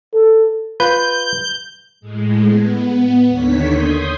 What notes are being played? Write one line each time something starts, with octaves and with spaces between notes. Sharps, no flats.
A4
F4 B4 G6
A2 G#3
B3
D#2 D3 D#3 C#5 B6
C6 D#6 G6 G#6